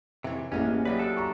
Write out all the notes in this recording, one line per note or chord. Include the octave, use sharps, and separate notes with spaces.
F2 C3 E3 C#5
A1 E3 G#3 A#3 C#4 D4
E3 F#3 B3 G4 B4 D5
D4 A4
A#5 C#6